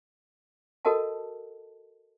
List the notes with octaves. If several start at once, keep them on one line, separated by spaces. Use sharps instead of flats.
F#4 A4 A#4 D#5 F#5 A5